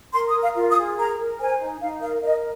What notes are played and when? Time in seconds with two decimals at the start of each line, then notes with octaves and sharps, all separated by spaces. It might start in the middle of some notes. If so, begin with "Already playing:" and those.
0.14 A#4 C6
0.29 D#6
0.35 A#4
0.42 F5
0.55 F4
0.70 D#6
0.77 G#4
0.97 A#4 A#5
1.18 A#4
1.39 C5 G#5
1.60 D#4
1.80 D#4 F5
2.01 A#4 F5
2.22 A#4 D#5